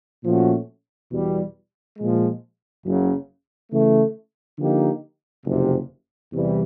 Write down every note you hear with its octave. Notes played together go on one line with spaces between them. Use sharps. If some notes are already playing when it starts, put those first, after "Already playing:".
A#2 F3 A3 C#4 F#4
E2 B2 G3
A#2 F3 G#3
F#1 F#2 C#3 F#3
C#3 E3 A3
D3 F3 A#3 D#4 G4
F#1 F2 C3
E2 C3 E3 G3